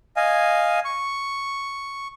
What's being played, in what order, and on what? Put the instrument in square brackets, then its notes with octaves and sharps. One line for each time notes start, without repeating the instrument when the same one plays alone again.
[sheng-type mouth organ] D#5 F5 G#5
C#6